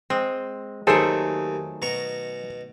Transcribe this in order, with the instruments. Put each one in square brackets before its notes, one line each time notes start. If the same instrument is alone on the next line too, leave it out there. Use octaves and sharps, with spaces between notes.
[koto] G#3 [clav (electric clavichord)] C4
[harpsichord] D#2 [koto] D#3 F#3 A3 [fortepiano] G#4 [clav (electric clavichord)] A4 C5
[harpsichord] B2 A#5 C#6